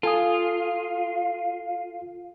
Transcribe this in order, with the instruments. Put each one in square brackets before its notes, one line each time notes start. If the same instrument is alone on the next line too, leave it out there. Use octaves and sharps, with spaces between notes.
[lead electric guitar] F4 [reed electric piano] A4 G#5 D#6 [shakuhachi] F5